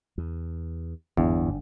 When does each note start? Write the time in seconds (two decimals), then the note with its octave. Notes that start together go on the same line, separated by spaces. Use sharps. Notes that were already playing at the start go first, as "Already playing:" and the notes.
0.18 E2
1.17 G1 E2 G#2 D4